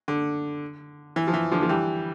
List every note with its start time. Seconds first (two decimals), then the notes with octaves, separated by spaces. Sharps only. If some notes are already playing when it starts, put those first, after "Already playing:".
0.08 D3
1.16 E3
1.27 F3
1.34 E3
1.51 D3 F3
1.62 F3
1.69 E3 G3